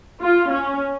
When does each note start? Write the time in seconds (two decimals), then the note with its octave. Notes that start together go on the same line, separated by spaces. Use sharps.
0.23 F4
0.52 C#4